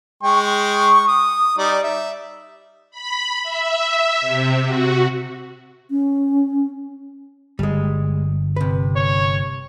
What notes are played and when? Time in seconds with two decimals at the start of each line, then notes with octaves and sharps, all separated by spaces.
0.23 G#3 G5 C#6
1.08 D#6
1.58 G3 D#4 D5
1.84 E5
2.91 B5
3.43 E5
4.21 C3
4.65 F#4
5.91 C#4
7.59 G1 G3 G#3
8.56 C3 B4
8.96 C#5